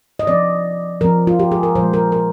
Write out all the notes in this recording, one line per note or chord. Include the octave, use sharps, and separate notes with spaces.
D#5
F3 C4 D5
F3 C4 A#4
F4
G4
G#4
A#4
A#2 F3 G#3 C5
A#4
A#4